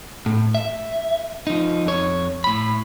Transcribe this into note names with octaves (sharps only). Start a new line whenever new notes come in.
A2
E5
F3 D#4
F2 C#5
A2 B5